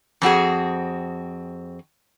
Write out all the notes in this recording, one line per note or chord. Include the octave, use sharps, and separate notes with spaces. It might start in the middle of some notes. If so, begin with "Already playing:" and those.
F2 C4 F#4 G#4